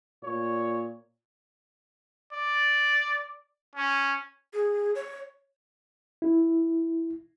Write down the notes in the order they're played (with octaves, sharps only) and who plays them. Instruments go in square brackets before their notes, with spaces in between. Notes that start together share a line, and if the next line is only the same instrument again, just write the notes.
[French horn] A#2 [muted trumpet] C#5
[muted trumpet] D5
C#4
[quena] G#4
C#5
[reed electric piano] E4